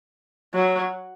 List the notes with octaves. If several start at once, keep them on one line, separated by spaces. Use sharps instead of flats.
F#3